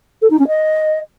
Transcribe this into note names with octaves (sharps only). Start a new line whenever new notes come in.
A4
D#4
C#4
D#5